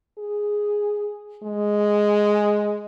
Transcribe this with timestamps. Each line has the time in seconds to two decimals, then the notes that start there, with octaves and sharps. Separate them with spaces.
0.18 G#4
1.44 G#3